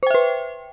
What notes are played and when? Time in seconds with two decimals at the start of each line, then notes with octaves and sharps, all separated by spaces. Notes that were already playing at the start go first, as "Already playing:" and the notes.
0.03 C5
0.07 G5
0.10 E5
0.14 B4